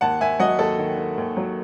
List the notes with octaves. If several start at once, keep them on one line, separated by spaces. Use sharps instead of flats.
D#2 F#5 A5
D#2 E5 G#5
F#3 D#5 F#5
D#2 A4
D#3
D#3
D#2
F#3